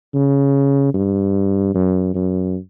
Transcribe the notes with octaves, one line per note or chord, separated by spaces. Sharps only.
C#3
G2
F#2
F#2